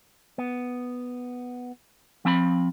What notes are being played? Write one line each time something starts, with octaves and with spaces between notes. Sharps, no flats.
B3
F3 C4 A5 B5